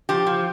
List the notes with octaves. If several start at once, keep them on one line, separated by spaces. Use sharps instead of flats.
F3 G4
F3